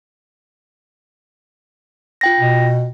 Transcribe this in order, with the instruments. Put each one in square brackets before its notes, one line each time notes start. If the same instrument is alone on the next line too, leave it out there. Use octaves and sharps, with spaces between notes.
[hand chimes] F4 G5 A#6
[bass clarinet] B2